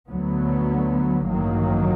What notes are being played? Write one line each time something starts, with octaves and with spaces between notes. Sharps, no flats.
D2 D3 F#3 B3
A1 G2 D#3 F#3 A#3